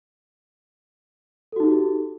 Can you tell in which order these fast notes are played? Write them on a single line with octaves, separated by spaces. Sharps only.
A4 F#4 D#4 G4